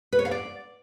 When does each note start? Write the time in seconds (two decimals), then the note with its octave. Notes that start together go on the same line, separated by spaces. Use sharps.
0.12 B4
0.19 C#5
0.25 F5
0.31 D5